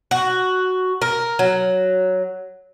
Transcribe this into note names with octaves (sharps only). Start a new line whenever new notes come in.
F#4
A#4
F#3